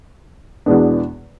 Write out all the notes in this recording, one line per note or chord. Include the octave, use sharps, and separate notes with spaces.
E2 B2 G#3 B3 D4